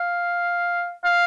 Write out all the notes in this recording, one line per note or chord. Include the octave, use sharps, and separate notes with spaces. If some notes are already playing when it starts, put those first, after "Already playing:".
Already playing: F5
F5